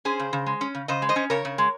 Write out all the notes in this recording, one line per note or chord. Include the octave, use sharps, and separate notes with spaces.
C#4 G#4 C5
C#3
C#3
G#3
C#4
C#3
C#3 C5 D#5
G#3
C5 D#5
C#4
C#3 A#4 C#5
C#3
G#3